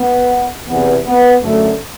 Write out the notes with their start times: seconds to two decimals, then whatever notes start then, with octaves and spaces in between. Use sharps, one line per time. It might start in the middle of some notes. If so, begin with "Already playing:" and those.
Already playing: B3
0.68 E2 C3 E3 B3
1.06 B3
1.44 F#2 D3 A3